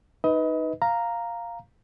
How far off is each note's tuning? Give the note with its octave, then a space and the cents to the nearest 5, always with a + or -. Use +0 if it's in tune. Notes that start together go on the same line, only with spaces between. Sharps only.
D#4 +0 B4 +0 D#5 +30
F5 +0 A#5 +0